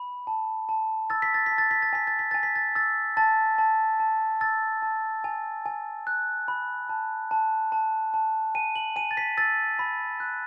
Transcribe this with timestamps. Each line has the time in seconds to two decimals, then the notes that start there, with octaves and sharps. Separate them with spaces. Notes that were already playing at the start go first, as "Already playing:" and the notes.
Already playing: B5
0.27 A5
0.69 A5
1.10 E6 A6
1.22 B6
1.34 A6
1.46 B6
1.51 A5
1.58 A6
1.71 B6
1.82 A6
1.93 G#5 B6
2.07 A6
2.19 B6
2.31 G#5 A6
2.43 B6
2.56 A6
2.75 E6 A6
3.17 A5 A6
3.58 A5
4.00 A5
4.41 E6 A6
4.82 A5
5.24 G#5
5.66 G#5
6.07 F#6
6.48 B5
6.89 A5
7.31 A5
7.72 A5
8.14 A5
8.55 G#5 D#7
8.76 F#7
8.96 G#5 D#7
9.11 A6
9.17 B6
9.37 E6 A6
9.79 B5
10.20 F#6